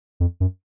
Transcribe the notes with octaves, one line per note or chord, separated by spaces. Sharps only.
F2
F#2